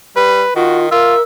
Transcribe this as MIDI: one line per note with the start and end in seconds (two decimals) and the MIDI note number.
0.16 0.44 55
0.16 0.53 71
0.56 0.90 51
0.56 0.90 65
0.56 0.80 66
0.91 1.15 65
0.91 1.22 70
0.91 1.22 76